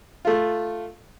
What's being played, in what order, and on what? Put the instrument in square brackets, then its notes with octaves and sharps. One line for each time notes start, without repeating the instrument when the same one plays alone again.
[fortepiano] A3 F4